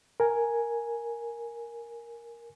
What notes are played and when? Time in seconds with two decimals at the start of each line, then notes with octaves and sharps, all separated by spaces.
0.20 A#4 G#5